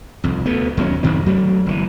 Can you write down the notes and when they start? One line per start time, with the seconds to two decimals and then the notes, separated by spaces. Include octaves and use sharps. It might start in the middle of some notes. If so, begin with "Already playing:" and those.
0.24 C2 F2
0.46 D2 A3 B3
0.77 D#2 F#3 A#3 C#4
1.03 F#2 D#3 F#3 C4
1.26 F#3 A3 A#3
1.66 G1 C#3 E3